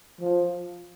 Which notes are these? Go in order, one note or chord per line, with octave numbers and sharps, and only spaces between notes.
F3